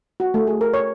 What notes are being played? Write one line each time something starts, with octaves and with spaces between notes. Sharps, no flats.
F#4
A3
G#4
A#4
C#5